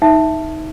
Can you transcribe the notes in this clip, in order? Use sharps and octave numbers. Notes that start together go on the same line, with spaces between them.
D#4 E5